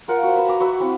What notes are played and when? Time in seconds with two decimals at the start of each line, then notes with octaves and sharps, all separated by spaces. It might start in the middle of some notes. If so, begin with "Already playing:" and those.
0.08 F4 A#4 F#5
0.23 F#4 C5
0.36 B4 E5
0.48 A#5 D6
0.60 F#4 B4 E5
0.80 C4 E4 F5